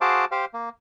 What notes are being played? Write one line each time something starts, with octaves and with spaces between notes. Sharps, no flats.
F#4 G#4 C5 F5 A5 D6
G4 C5 F5
A#3